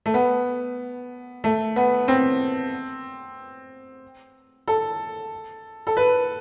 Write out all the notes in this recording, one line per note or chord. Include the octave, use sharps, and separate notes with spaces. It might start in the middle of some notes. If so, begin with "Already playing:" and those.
A3
B3
A3
B3
C4
A4
A4
B4